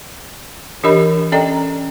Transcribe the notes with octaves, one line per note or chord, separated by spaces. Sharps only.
E3 D4 G4 A#4 D#5 B5
C#4 A4 D5 D#5 G5 A#5